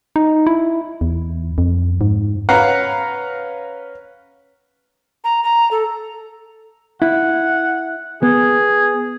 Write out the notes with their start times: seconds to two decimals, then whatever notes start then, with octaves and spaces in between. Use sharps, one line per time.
0.16 D#4
0.47 E4
1.01 E2
1.58 F2
2.01 G#2
2.49 C#4 B4 F5 F#5 A#5
5.24 A#5
5.43 A#5
5.71 A4
7.02 E4 F#5
8.23 B3 G#4